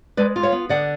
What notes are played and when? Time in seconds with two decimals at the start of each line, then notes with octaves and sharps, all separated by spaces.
0.17 G#3 B4 D5
0.36 F4
0.43 C#5 F5
0.52 B3
0.69 D3 D5 F#5